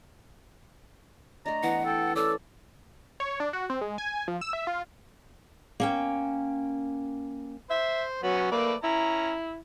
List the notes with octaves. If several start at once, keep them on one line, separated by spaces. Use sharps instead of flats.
A3 D4 D#5 A#5
E3 B3 F#5
A4 G5
C#4 A4 D5 E6
C#5
D4
F#4
C4
G#3
G#5
F3
E6
E5
F4
A#3 C#4 G5
C5 E5
F#3 B3 C#4 F#4
A3 A#3 B4 D5
C#4 E4 A#5